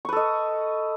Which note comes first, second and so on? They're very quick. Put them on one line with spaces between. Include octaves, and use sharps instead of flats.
C#6 B4 A4 D#5